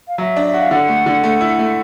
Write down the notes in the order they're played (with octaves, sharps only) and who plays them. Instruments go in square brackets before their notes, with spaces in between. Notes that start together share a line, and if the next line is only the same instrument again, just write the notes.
[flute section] F5
[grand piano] F#3 [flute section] E5
[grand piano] D4
[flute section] E5
[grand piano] F#4
[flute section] F5
[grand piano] D3 [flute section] F#5
[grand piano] A3
D3
A3
E4
A3